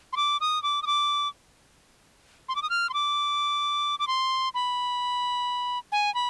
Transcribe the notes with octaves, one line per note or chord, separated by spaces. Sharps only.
C6
D6
D#6
D6
D#6
D6
C6
D6
D#6
F6
C6
D6
D6
C6
B5
G#5
B5